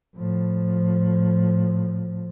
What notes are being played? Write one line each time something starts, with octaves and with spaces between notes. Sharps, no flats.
A2 F3